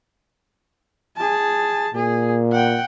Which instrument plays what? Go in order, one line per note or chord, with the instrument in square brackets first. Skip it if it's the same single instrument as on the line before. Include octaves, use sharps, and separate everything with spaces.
[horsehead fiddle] G#4 A5
[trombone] A#2 [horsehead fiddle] G#4
[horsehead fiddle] F#5 G5